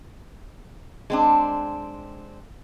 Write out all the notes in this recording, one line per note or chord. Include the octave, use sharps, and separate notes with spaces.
G#3 C4 D4